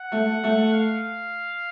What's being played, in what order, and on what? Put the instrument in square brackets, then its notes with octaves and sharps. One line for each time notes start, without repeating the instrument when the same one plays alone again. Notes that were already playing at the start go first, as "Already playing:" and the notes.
Already playing: [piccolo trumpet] F#5
[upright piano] A3
A3
[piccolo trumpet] F5